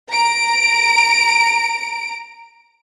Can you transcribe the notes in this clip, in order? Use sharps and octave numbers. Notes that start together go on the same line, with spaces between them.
A#5 D7